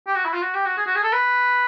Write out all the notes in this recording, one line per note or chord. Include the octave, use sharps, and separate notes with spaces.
G4
F#4
E4
F4
F#4
G4
F#4
G#4
F#4
G#4
A4
B4